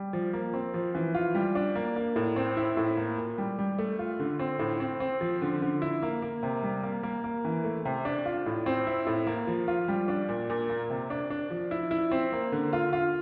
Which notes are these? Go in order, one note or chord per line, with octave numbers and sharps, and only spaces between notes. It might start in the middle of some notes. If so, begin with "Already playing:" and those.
Already playing: G3
F3
A#3
C4
F3
E3
F4
G3
D4
A#3
A#3
A2
C4
E4
A2
A#3
A#2
G3
G3
A3
F4
D3
C4
A2
C4
C4
F3
D3
D3
E4
A#3
A#3
C3
G3
A#3
A#3
A#3
E3
A3
C3
D4
F4
A2
C4
E4
A2
A#3
F3
F4
G3
D4
A#2
A#2
A#3
C3
D4
D4
F3
E4
E4
C4
A#3
D3
F4
F4